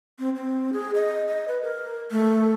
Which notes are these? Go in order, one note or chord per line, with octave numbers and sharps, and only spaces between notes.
C4
C4
G#4
D#5
D#5
B4
A#4
A3